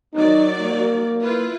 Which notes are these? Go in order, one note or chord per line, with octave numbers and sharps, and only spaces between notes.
D#3 F#3 D#4 D5
A#3
E4 F4 B4